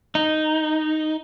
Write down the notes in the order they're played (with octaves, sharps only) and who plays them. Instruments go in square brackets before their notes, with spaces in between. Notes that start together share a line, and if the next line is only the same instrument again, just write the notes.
[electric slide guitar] D#4